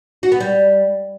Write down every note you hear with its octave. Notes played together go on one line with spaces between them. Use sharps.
F#4
B3
G3